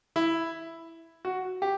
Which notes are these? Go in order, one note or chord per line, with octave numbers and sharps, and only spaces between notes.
E4
F#4
G4